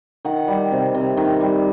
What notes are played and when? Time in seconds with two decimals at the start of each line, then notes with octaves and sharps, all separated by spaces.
0.25 D#3 F#5
0.48 G3
0.72 C3
0.94 C3
1.17 D#3
1.41 G3